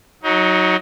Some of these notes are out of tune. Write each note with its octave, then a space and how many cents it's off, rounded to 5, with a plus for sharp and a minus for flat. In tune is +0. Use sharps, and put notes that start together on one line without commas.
F#3 +0 D#4 +25